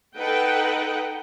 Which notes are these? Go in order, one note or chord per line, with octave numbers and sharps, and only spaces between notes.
D#4 A4 B4 F#5 G5